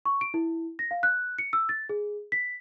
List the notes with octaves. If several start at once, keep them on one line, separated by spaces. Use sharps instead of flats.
C#6
D7
E4
A#6
F5
F#6
C#7
E6
A6
G#4
B6